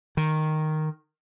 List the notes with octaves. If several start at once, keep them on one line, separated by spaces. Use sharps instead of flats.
D#3